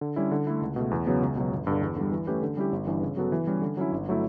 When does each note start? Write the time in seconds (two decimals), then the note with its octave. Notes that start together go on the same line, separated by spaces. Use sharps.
0.01 D3
0.16 G3 C#4 E4
0.31 D3
0.47 A3 E4
0.62 C#2
0.76 B2 A3
0.91 E2
1.07 C#3 F#3 B3
1.22 C#2
1.36 B2 F#3
1.52 G1
1.67 G2 D3
1.81 E2
1.96 D3 G3
2.12 E3
2.27 A3 C#4 G4 B4
2.42 D3
2.57 G3 C#4 E4 G4
2.72 G1
2.87 G2 E3
3.02 C#3
3.17 F#3 B3 F#4 A4
3.32 E3
3.47 G3 C#4
3.62 D3
3.77 F#3 C#4 E4
3.92 G1
4.09 F#3 A3 E4